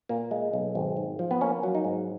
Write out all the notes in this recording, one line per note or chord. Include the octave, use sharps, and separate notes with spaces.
A#2 A#3
G#3
B1
G#1
G#2
F3
B3
A#3 C#4
F#3
D#4
G#2